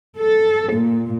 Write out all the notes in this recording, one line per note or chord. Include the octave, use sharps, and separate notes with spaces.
A4
A#2